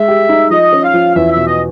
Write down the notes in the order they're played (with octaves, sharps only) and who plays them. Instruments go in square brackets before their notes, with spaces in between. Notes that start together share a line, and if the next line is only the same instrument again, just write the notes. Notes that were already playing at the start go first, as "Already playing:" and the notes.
Already playing: [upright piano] G#3 [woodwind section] E5
[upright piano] G4
D#4
[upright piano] F3 [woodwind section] D#5
[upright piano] C#4
[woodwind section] F5
[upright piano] F3
[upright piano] E2 [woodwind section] E5
[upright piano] B2 [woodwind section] E5
[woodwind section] D#5